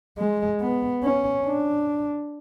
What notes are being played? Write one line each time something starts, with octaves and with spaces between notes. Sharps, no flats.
G#3
B3
C#4
D4